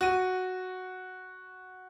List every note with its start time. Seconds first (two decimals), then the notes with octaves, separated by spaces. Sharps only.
0.01 F#4 D#7